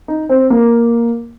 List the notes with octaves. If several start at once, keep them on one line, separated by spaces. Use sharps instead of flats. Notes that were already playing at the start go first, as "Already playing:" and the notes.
D#4
C4
A#3